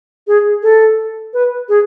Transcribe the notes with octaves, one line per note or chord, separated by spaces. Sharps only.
G#4
A4
B4
G#4